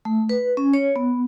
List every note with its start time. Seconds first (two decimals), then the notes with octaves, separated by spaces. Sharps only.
0.05 A3
0.29 B4
0.57 C#4
0.74 C#5
0.96 B3